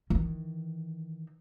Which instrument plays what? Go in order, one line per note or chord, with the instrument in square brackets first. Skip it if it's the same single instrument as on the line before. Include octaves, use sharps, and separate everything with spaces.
[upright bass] D#3 E3